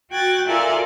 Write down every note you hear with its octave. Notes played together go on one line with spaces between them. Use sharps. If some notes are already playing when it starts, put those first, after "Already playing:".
F#4 G5 F#6 G#6 A6
F4 A4 A#4 D5 E5 G#5